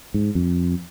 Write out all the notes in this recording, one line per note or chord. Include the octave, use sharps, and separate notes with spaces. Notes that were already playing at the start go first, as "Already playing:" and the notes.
G#2
F2